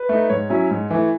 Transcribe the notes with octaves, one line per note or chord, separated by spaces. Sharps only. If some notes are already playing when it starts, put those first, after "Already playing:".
Already playing: B4
A3 D#4
G#2 C#5
F#3 C#4 E4
G#2
E3 A3